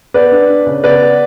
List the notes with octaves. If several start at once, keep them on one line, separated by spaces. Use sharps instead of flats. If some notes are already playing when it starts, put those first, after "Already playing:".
B3 B4 D5
D4
D4
C#3
B3 B4 D5
B3